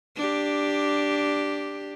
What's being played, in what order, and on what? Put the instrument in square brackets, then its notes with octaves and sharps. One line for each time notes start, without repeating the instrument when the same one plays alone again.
[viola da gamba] D4 G4